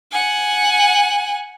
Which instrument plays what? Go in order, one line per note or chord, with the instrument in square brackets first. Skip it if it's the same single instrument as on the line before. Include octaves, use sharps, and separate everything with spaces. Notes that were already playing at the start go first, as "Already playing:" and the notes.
[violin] F#5 G#5